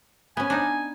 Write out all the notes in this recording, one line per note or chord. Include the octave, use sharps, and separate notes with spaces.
B3 C#4 G#5
D4 D#4